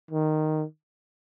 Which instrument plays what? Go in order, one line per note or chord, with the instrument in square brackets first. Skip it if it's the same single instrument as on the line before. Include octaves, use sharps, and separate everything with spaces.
[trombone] D#3